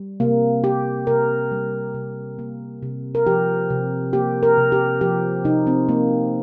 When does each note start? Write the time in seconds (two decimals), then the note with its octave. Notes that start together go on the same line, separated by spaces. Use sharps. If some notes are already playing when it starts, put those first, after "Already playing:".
Already playing: G3
0.20 C3 A#3
0.64 A#3 G4
1.07 C3 A#4
1.52 G3
1.95 C3
2.39 A#3
2.83 C3
3.15 A#4
3.27 F3 G4
3.70 C3
4.13 A#3 G4
4.43 A#4
4.57 C3
4.72 G4
5.01 F3 G4
5.44 C3 D#4
5.67 C4
5.89 A#3